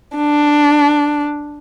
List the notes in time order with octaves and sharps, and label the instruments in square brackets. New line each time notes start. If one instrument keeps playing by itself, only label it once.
[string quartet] D4